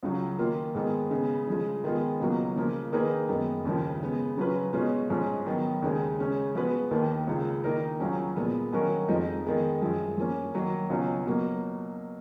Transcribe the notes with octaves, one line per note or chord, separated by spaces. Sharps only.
C#2 C#3 F#3
D#3 A#3 F4
G#2 D#3 G#3 B3
C#3 G#3 B3
C#3 F3 G#3
D#3 G#3 B3 F4
C#2 B2 F#3 A#3
C#3 F3 A#3
D#3 A#3 D#4 G#4 B4
F#2 D#3 G#3 B3
D#2 C#3 F3
C#3 G#3 B3
C#3 F#3 C#4 F4 B4
B2 G#3 C#4 F4
G#2 F3 G#3 C#4
D#3 F#3 B3
D#2 C#3 G#3
C#3 G#3 C#4
F3 G#3 B3 F#4 B4
D#2 D#3 A#3
C#2 C#3 G#3
D#3 A#3 D#4 A#4
C#2 C#3 F#3 C#4
A#2 F3 G#3 B3
D#3 F#3 C#4 F#4 A#4
F2 F3 G#3 D#4
D#3 G#3 B3
F#2 F3 G#3
F3 A#3 C#4
D#3 F#3 A#3
C#2 B2 F#3 C#4
B2 F#3 A#3